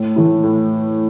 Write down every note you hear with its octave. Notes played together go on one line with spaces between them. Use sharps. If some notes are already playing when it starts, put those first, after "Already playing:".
Already playing: A2
E3 A3 E4
A2